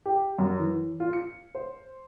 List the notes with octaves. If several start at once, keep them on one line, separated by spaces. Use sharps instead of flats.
G4
F#2
E3
F4
C#7
C5